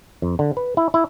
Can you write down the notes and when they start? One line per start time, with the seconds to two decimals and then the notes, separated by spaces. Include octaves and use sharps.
0.22 F2
0.39 D3
0.57 B4
0.77 E4
0.94 E4